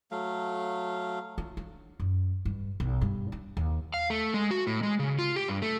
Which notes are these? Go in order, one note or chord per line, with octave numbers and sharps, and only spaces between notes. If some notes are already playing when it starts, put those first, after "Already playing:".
F#3 A3 F5
F4
D4
F#2
G2
B1
G2
D4
D#2
F5
A3
G#3
F#4
A2
G#3
C#3
F4
G4
G2
A3